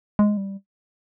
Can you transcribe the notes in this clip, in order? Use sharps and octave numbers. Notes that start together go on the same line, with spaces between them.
G#3
G3